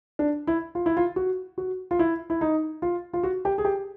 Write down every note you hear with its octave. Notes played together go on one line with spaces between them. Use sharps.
D4
E4
F4
E4
F4
F#4
F#4
F4
E4
E4
D#4
F4
F4
F#4
G4
G#4
G4